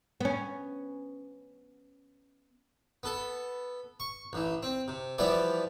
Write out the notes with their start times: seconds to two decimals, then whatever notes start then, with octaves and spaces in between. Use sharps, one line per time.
0.20 B3 C#4
3.03 B3 A4
4.00 C#6
4.33 A1 E3
4.63 C4
4.88 C3
5.18 E3 F3 G3 B3 E4 D5